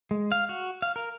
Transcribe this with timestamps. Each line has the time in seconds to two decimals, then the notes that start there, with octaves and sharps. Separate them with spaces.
0.11 G#3
0.32 F5
0.49 F#4
0.82 F5
0.96 A#4